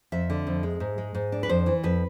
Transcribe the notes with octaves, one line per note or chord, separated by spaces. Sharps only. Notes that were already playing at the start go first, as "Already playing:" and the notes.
F2 E5
D3
F2
G#3
G#2
G#3
G#2
D4
B4
F2 C5
E3
F2 B4